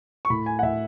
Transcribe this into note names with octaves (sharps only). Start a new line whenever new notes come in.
C#6
A2 B5
G#5
F#5
A2 E5